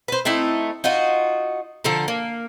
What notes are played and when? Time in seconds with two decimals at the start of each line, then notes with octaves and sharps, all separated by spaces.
0.08 B4 C5
0.25 A3 C4 D#4 E4
0.84 D#4 F4 F#4 D#5
1.84 D3 F3 A4 A#4
2.08 A#3